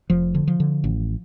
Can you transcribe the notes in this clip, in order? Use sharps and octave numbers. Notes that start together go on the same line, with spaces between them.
F1 F3
D3
F3
D3
A1